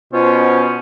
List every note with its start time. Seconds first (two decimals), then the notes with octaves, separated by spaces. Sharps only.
0.13 B2 B3 C#4 F4 C5